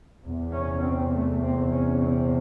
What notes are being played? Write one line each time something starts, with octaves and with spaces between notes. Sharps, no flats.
E2 C3
C#4
C4
A3
C4
C#4
C4